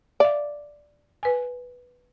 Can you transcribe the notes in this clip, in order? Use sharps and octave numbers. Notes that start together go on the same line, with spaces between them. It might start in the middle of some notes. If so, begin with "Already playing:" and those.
D5 E5 F5
B4 G#5